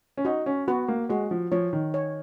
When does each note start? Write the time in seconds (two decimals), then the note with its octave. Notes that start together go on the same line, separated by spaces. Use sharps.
0.17 C#4
0.25 D#4 F#4
0.46 C#4
0.68 B3 F#4
0.88 A#3
1.09 G#3 F#4
1.31 F3
1.52 F3 C#5
1.73 D#3
1.94 C#5